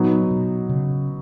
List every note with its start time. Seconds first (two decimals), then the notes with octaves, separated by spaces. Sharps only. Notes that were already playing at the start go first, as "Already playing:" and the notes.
Already playing: A#2 F#3 B3 D#4
0.31 B2
0.69 C#3